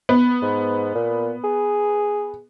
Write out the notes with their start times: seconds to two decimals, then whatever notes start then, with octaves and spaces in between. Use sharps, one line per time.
0.09 B3
0.42 G#2
0.95 A#2
1.44 G#4